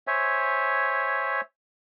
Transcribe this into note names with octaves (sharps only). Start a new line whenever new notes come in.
C5 C#5 E5 G#5